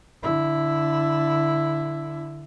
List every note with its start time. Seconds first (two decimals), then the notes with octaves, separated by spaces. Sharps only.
0.23 D3 E4